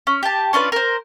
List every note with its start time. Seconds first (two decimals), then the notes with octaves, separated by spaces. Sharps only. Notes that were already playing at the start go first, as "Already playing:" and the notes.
0.07 C#4
0.23 G4 A5
0.53 C#4 D4 F4 B4
0.72 A#4 C5